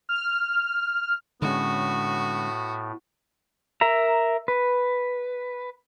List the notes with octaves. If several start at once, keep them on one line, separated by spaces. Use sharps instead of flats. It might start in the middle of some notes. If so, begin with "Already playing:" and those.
F6
A2 D3 G#3 B3 C#4 F#4
A#4 E5 A#5
B4